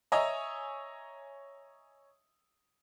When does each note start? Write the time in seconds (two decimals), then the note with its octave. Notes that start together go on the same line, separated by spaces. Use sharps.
0.12 C#5 D#5 E5 G#5 A#5 E6